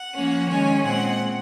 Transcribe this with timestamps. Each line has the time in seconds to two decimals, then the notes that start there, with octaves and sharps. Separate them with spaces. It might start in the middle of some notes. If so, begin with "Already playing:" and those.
Already playing: F#5
0.15 F3 A#3 C#4
0.49 D#3 G#3 C#4 G#5
0.83 A#2 G#3 C4 F#5